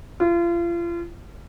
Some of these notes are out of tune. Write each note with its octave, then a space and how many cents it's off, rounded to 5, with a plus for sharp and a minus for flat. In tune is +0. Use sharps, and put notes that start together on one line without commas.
F4 -35